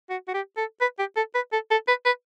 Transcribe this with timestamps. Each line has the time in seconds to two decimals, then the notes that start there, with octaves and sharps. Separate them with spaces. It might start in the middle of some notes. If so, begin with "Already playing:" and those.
0.10 F#4
0.28 F#4
0.34 G4
0.57 A4
0.81 B4
0.99 G4
1.16 A4
1.35 B4
1.52 A4
1.71 A4
1.88 B4
2.05 B4